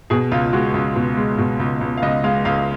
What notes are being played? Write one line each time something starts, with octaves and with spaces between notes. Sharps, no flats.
B2 G#4
C#2 F4
G#3 F#4
C#2
B2
G#3
B2
C#2
C#2
F5
C#2 D#5
G#3 F5
C#2 F5